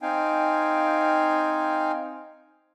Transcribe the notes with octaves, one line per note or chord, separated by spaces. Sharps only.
C4 D#4 F5 G5 G#5